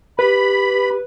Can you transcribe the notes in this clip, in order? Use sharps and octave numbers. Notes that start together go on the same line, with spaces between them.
G4 B4 B5